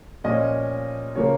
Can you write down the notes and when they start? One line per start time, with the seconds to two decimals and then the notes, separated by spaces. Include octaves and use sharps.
0.24 A#2 F3 C#4 D#5
1.15 C#3 F3 A#3 C#5